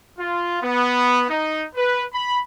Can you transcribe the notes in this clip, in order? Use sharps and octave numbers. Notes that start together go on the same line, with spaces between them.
F4
B3
D#4
B4
B5